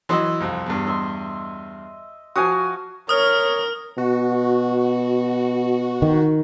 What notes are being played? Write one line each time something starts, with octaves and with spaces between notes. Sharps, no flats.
E3 F#3 D#5 C6 E6
C2 F2
E2 G2
D#5 E5 C6
F3 F#4 F5 G#5 D#6
A#4 C#5 D#6 F6
B2 F#4
D#3